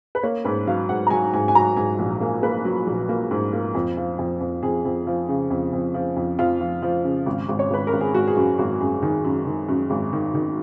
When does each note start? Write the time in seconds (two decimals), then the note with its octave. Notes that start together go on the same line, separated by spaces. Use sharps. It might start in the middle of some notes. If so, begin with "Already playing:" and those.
0.15 B4
0.23 A#3 C#5
0.45 G#2 B4
0.67 F#3 F5
0.89 G#2 F#5
1.07 A#5
1.10 F#3 G#5
1.33 G#2 G#5
1.48 G#5
1.55 F#3 A#5
1.77 G#2 G#5
1.99 A#1
2.21 A#3
2.43 A#3 B4
2.65 F#3
2.87 A#1
3.09 A#3
3.31 G#2
3.53 A#3
3.75 F2
3.97 F3
4.19 F2
4.41 F2
4.63 F2 G#4
4.85 F2
5.07 F3
5.29 C#3
5.51 F2
5.73 F2
5.94 F3
6.16 F2
6.39 F2 F4
6.61 F3
6.82 F3
7.04 C#3
7.26 G#1
7.49 G#1
7.59 C#5
7.70 G#1 B4
7.87 A#4
7.93 G#1
8.01 G#4
8.14 G#1 F#4
8.28 G#4
8.37 F#2 F#4
8.59 G#1 F#4
8.80 F#2 G#4
9.02 D#3 G#4
9.24 F#2
9.47 D#3
9.69 F#2
9.90 G#1
10.13 D#3
10.34 D#3